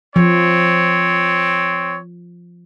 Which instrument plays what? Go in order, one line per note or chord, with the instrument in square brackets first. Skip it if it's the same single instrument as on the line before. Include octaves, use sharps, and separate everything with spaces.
[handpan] F3 [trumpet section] C4 C#5